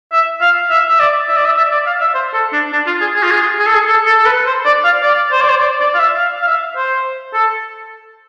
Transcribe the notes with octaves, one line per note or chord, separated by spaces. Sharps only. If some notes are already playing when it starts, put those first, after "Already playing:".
E5
F5
E5
E5
D5
E5
D5
E5
E5
D5
F5
E5
C5
A4
D4
D4
F4
G#4
G#4
F4
G#4
G#4
A4
G#4
A4
A4
A4
B4
C5
D5
F5
D5
C5
D5
C5
D5
D5
F5
E5
F5
F5
E5
C5
A4